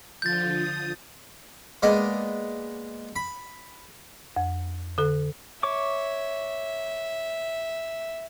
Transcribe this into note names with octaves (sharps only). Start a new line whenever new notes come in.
D3 F3 F4 G6 A6
D#6
G#3 A#3 B3 D5 D#5
B5
F2
D3 A4
C#5 E5 C#6 D6